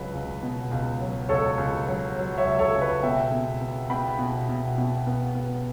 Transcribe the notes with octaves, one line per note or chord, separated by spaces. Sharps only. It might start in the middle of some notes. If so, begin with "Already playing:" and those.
Already playing: C#2 F#3 B4
C#2
B2
C#2
F#3
C#2 A4 C#5
C#2
F#3
F#3
C#5 E5
C#2
A4 C#5
C#2
B4
B2 E5 G5
B2
B3
B3 G5 B5
B2
B2
B2
B3
B3